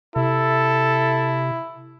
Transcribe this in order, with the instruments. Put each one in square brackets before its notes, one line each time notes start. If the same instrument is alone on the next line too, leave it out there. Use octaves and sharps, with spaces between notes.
[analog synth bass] C3 [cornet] E4 [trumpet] A4